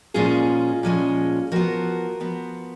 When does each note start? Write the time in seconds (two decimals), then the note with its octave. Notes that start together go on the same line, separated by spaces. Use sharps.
0.14 A#2 F3 G#3 C#4 F4 G#4
0.83 A#2 F3 G#3 C#4
1.52 F3 B3 F#4 A#4
2.20 F3 B3